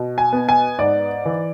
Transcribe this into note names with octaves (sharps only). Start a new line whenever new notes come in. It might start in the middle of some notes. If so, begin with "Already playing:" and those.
Already playing: B2
G#5
B3
G#5
G#2 D5
E3